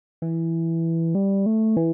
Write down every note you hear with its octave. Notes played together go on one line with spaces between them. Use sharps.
E3
G3
A3
E3